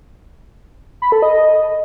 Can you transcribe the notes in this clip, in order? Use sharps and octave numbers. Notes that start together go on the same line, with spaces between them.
B5
A4
D#5